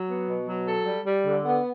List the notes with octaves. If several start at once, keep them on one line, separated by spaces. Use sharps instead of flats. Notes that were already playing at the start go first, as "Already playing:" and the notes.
Already playing: F#3
B3
B2
F#3
A4
G3
G3
D3
B3